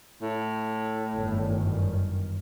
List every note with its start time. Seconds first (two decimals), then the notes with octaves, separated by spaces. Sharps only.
0.22 A2
1.17 G1 F#2 D#3